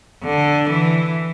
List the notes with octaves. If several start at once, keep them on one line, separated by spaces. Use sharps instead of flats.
D3
E3